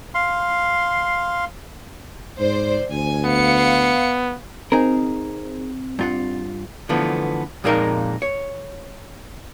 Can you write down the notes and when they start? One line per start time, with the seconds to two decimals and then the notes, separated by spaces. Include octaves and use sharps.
0.15 F5 C6
2.39 G#2 C5 D5
2.90 D2 G#5
3.25 B3 F5 C#7
4.72 C4 D#4 G#4 A#4
5.99 G2 F4 F#5
6.89 D3 E3 F3 A3 B3
7.64 F2 A#2 G#3 A#3 D#4 A#4
8.22 C#5